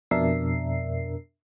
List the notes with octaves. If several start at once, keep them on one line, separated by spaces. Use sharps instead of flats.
F2 B2 D4 A#4 E5 C7